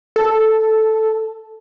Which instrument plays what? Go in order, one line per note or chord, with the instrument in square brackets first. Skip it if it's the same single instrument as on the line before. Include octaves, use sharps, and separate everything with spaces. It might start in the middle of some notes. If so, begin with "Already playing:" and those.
[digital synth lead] A4